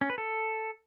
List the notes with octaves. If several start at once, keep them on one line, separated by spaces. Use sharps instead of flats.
C#4
B4
A4